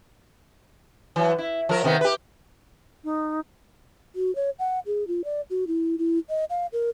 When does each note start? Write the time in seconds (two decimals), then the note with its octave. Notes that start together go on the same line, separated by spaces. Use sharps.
1.16 E3 F#3
1.38 E4
1.69 F3 A#4
1.84 C3 D#3 B3
2.01 G4 B4
3.04 D#4
4.15 F#4
4.36 C#5
4.59 F#5
4.86 G#4
5.07 F4
5.24 D5
5.50 F#4
5.67 E4
5.99 E4
6.29 D#5
6.50 F5
6.73 A#4